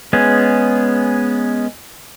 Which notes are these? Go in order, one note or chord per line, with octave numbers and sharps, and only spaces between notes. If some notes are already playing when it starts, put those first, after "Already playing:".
G#3 B3 C#4 G#4